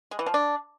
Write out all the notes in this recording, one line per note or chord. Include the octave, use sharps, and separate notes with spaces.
G#3
E3
F3
D4